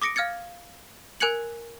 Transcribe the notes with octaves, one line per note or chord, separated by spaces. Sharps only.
D6 D#6 A#6 C#7 D7
F5 F6 G#6 A6 C#7
A#4 G#5 F#6 G#6 C#7 F#7